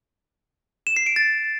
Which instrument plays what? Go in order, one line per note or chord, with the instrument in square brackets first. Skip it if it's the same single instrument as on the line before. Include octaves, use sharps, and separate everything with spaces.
[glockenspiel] E7
C7
D7
A6